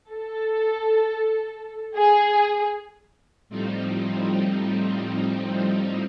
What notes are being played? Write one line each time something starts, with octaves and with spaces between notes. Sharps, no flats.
A4
G#4
A2 F3 G3 C4 D#4